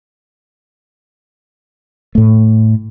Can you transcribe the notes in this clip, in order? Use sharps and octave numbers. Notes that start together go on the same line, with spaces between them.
A2 A3